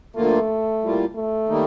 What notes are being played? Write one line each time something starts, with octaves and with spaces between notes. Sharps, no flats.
D2 D3 F3 A3 A#3 F4
A2 G3 A#3 F4
A3
D#3 G3 A#3 D#4